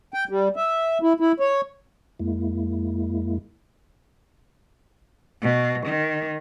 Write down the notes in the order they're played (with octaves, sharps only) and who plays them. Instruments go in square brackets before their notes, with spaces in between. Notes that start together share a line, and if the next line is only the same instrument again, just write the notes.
[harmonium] G5
G3
E5
E4
E4
C#5
[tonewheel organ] F2 G#3 A#3 E4
[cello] B2
D#3